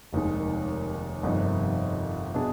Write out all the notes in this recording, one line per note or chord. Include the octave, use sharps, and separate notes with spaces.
F1 D#2 D#3 G#3
G1 F2 C3 D#3
B2 B3 D4 G#4